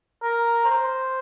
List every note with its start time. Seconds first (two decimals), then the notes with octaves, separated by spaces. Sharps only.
0.23 A#4
0.65 C5